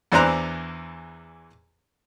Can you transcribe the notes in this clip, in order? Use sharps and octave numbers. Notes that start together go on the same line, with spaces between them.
E2 E3 D4 C5 A#5 F#6